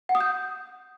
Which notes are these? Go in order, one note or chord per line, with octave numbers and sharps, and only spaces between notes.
F#5
D#6
G6